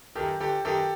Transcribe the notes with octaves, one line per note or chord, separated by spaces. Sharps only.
F#2 D#3 G4 A4
G1 G4 A4
F#2 D#3 G4 A4